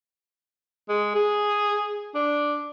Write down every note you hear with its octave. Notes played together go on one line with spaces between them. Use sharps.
G#3
G#4
D4